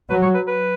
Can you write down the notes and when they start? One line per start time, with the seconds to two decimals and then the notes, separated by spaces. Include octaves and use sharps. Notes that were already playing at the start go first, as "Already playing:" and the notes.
0.10 F#3 B4
0.22 C#5
0.35 B4
0.47 B4